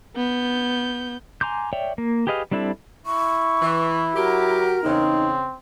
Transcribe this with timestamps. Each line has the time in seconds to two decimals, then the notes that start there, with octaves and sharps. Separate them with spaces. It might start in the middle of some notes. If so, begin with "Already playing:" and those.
0.16 B3 G6
1.41 G#5 A#5 C6 D6 G6
1.73 C#5 D5 E5 G5
1.98 A#3
2.27 G4 G#4 B4 D#5 F5
2.51 G3 C4 D4 E4 A4
3.06 E4 C#6
3.61 E3
4.15 F#3 F#4 G4 A#4
4.83 E2 C#3 C4 D#4